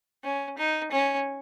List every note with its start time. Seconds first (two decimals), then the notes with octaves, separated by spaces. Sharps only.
0.24 C#4
0.58 D#4
0.92 C#4